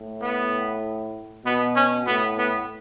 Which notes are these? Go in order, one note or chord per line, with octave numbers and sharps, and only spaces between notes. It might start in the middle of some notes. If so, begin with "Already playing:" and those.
Already playing: A2
B3
B2 B3
C#4
A2 B3
B3